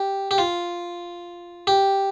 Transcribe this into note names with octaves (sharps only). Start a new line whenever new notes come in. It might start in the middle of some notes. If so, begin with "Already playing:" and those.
Already playing: G4
G4
F4
G4